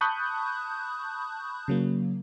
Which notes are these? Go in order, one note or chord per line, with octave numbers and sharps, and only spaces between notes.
A5 B5 C#6 D#6 F#6 G6
C#3 F#3 A#3